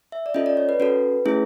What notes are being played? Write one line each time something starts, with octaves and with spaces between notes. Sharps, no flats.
E5
D5
C#4 F4 A4 D#5
D5
C#5
B4
C#4 F#4 A4 B4
A3 C#4 E4 G#4